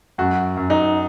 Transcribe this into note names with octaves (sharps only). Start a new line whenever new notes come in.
F#2 F#4
F#2
D#4